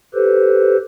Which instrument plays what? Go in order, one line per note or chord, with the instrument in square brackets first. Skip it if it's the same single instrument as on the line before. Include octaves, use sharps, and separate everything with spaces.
[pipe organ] G4 A4 B4 C5